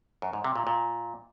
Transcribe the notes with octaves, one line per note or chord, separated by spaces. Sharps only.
F#2
G#2
C3
A#2
A#2